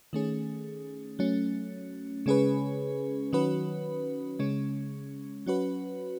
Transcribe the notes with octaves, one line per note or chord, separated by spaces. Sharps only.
D#3 A3 C#4 G#4
F#3 A3 C#4
C#3 G#3 C#4 G#4 B4
D#3 F#3 C#4 F#4 B4
C#3 G#3 C#4
F#3 C#4 F#4 B4